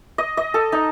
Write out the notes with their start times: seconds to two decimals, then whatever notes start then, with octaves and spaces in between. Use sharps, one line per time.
0.18 D#5
0.37 D#5
0.54 A4
0.72 D#4